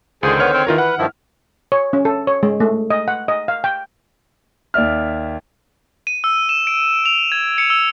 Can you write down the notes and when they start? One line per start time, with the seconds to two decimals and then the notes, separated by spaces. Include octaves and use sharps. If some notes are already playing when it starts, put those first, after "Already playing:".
0.23 C#2 D3 D#3 G#4 C5
0.40 B3 C#5 F6
0.54 C4
0.67 D#2 D#3 E3 F4 A#4
0.78 B4 F#5
0.98 G2 D#3 F3 E4
1.72 C#5
1.93 C#4
2.05 A4
2.27 C#5
2.43 G#3
2.60 A3
2.90 D#5
3.08 F#5
3.28 D#5
3.48 F5
3.64 G5
4.74 D#2 D5 E5 F6
6.07 D#7
6.24 E6
6.49 E7
6.67 D7
7.05 F7
7.32 G#6
7.58 C#7
7.70 E6